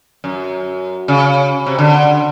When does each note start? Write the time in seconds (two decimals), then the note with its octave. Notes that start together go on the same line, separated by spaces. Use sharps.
0.24 F#2
1.08 C#3
1.66 C3
1.79 D3